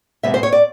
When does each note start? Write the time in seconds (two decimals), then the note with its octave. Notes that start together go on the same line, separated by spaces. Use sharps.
0.23 C3 D#3 G#3 B3 E5
0.34 C5
0.43 C#5
0.52 D5